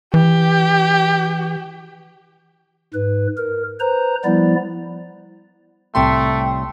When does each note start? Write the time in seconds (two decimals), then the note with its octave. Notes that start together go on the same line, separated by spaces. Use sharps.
0.14 E3 G4
2.94 G#2 B4
3.37 A#4
3.80 B4 C5 A#5
4.24 F3 G3 B3 E4 D5
5.95 C2 A2 C3 G3 A3 G5 C6